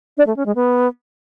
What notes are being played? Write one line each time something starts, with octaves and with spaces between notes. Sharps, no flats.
D4
A3
C#4
G#3
B3